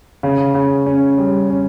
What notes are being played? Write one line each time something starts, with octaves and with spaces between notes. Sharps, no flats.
C#3
C#3
C#4
G3
C#4